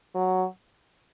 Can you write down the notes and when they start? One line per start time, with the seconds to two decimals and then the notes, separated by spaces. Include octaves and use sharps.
0.15 F#3